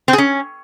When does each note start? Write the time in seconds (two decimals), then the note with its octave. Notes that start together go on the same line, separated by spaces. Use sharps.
0.08 C4
0.13 G#4
0.18 C#4